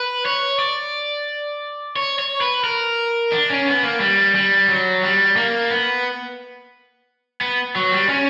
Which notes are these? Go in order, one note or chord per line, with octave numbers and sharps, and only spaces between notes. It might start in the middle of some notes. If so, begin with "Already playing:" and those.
Already playing: B4
C#5
D5
C#5
C#5
B4
A#4
D4
C#4
B3
A#3
G3
G3
F#3
G3
A#3
B3
B3
F#3
G3
C#4